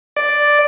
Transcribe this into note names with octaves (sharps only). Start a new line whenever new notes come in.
D5